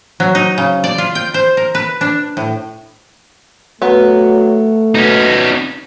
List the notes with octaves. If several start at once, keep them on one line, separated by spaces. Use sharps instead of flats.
F#3
D#4
C#3
D5
F4
G5
C5
A#4
B4
D4
A2
F#3 A3 B3 B4
B2 C#4 D#4